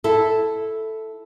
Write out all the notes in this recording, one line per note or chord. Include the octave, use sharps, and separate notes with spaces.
E4 A4